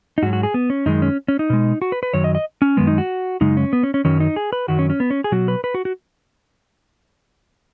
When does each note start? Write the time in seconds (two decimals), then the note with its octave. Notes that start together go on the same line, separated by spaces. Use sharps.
0.18 D#4
0.22 G#2 F#4
0.26 F#3
0.33 F#4
0.43 G#4
0.54 B3
0.70 C#4
0.86 F#2 D#3 G#3 D#4
1.02 C#4
1.28 C#4
1.39 D#4
1.50 B2 G#3
1.82 F#4
1.92 B4
2.03 B4
2.14 F#2 D#3 F#3 C#5
2.24 D#5
2.35 D#5
2.62 C#4
2.77 F#2 D#3 G#3 B3
2.87 D#4
2.98 F#4
3.41 F#2 C#3 G#3 D#4
3.57 C#4
3.73 B3
3.83 C#4
3.94 C#4
4.05 F#2 D#3 F#3 C#4
4.20 D#4
4.36 G#4
4.53 B4
4.68 F#2 D#3 F#3 F#4
4.79 C#4
4.90 C#4
5.00 B3
5.10 C#4
5.24 G#4
5.32 B2 F#3 F#4
5.48 B4
5.64 B4
5.74 F#4
5.85 F#4